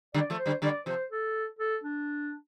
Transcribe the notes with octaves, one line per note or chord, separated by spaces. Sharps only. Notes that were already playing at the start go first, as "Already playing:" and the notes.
D3 G3 D5
F3 A3
C5
D3 G3
D3 G3 D5
C3 F3 C5
A4
A4
D4